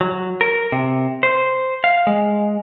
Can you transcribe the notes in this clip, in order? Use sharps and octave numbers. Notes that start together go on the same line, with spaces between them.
F#3
A#4
C3
C5
F5
G#3